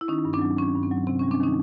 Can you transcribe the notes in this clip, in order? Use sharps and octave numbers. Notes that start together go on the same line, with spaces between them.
E4
D#3 C#4 D#4
G2
C4 D4
F#3
D#3 C#4
G2
C4
F#3
C3 C4
C#4
G3
C4 D4
D#3 C#4 D#4